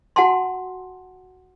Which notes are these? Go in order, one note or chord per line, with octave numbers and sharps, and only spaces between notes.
F#4 F#5 G#5 A5 C6